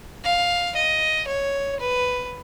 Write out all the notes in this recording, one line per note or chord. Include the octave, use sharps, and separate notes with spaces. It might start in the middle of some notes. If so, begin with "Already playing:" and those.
F5
D#5
C#5
B4